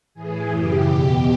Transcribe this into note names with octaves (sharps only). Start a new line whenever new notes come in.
A2 E3 G#4
F#2 C#3 E3 G4
E2 B2